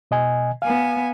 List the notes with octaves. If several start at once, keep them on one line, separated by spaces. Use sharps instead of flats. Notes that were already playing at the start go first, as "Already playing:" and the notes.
B2 D#5 G#5
B3 F5 G#5